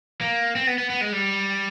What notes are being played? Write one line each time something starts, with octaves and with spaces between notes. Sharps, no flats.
A#3
C4
B3
B3
B3
G#3
G3